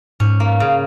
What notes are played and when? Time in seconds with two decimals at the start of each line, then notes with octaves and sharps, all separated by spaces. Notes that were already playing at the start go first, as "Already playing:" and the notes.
0.20 G#2 C#4
0.40 A#3
0.60 C#3